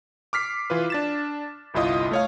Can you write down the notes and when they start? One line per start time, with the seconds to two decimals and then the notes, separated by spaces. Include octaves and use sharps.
0.33 D6 F6 B6 C7
0.70 E3 F4 B4
0.90 D4 A6 E7
1.74 G1 C2 E4 F4 D#5 D#6
2.11 A3 C#5 F5